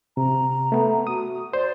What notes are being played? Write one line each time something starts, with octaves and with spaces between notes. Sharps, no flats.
C3 A#5
A3 B3
F#4 D#6
C5 D5